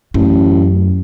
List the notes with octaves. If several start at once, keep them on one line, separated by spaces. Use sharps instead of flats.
A1 F#2